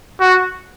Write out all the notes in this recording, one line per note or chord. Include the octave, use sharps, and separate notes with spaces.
F#4